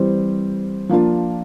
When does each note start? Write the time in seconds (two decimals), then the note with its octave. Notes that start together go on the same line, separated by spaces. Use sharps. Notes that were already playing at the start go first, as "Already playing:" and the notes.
Already playing: E3 G3 C4 G4 C5
0.89 F3 A#3 D4 F4